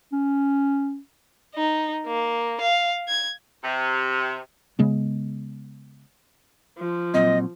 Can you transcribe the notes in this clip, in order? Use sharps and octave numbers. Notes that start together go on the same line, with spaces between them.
C#4
D#4
A#3
F5
G#6
C3
C#3 G#3 B3
F3
A#2 F#3 C4 D#5